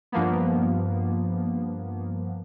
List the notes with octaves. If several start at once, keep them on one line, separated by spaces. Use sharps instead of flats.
G2 F3 A#3 B3